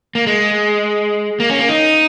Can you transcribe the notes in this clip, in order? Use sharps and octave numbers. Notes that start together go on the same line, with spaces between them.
A#3
G#3
A#3
C#4
A#3
D#4